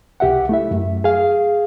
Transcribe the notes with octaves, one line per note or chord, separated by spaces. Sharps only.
C2 G4 E5 F#5
A3 E4 E5
F#2
G#4 F5